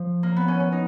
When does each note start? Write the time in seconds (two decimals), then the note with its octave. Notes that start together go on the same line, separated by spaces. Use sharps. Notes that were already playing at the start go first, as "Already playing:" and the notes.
Already playing: F3
0.23 A#3
0.36 B3
0.48 C#4
0.60 C#4
0.72 D#4